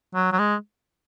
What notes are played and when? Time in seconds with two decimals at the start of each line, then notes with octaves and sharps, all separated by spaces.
0.15 F#3
0.32 F#3
0.39 G#3